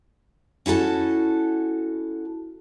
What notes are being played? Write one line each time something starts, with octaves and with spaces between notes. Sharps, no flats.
C#4 E4 F#4 A4 A5